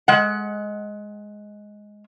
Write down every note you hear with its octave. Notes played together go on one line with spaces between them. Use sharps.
G#3 F#5